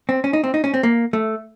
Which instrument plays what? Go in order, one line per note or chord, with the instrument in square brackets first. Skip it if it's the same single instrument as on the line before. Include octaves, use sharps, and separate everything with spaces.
[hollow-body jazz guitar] C4
C#4
D#4
C4
D#4
C#4
C4
A#3
A3